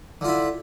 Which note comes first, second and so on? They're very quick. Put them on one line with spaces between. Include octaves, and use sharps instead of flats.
D3 F4 E4